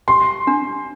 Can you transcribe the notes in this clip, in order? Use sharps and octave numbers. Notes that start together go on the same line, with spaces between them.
G4 C6
D4